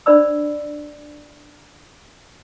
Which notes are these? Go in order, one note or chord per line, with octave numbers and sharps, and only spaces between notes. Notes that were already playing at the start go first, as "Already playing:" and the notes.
D4 C5 D5 B5 E6